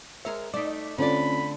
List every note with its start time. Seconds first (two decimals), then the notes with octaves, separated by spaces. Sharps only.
0.25 G#3 A#4 C#5 E5
0.54 A3 D#4 D5 D6 B6
0.98 D2 D3 C4 C#4 F4 D5 B5